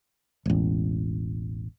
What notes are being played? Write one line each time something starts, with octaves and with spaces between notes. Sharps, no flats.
E1 A1